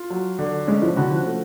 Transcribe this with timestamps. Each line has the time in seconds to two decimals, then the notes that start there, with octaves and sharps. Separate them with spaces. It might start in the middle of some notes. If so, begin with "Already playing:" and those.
Already playing: F4
0.10 F#3
0.39 D3
0.67 G#3 C#4
0.82 F3
0.96 D3 F#4
1.11 F3
1.26 A3